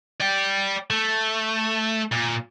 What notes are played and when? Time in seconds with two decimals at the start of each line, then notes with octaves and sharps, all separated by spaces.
0.20 D5 G5
0.91 A3
2.12 A#2